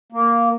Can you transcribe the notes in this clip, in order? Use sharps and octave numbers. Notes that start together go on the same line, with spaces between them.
A#3